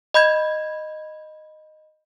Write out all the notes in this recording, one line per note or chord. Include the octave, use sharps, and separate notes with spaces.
D#5 B5 G6 G#6